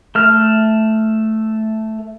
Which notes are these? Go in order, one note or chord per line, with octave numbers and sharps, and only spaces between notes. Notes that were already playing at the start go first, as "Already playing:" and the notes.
A3 F6